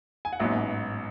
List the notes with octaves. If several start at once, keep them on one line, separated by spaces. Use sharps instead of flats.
G#5
F#5
A1 G#2 F#3 B3 E5